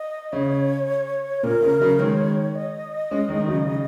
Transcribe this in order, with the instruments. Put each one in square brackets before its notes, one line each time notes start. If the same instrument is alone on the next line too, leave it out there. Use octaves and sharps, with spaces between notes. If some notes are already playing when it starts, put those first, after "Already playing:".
Already playing: [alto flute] D#5
[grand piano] C#3 [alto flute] C#5
[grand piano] A#2 [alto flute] A#4
[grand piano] C#3
C#3 F#3
[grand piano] D#3 G#3 [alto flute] C#5
[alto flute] D#5
[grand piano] G#3 C#4
D#3 G#3
D#3
C#3 F#3
C#3